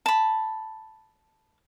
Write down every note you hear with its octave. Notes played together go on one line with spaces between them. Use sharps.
A5 B5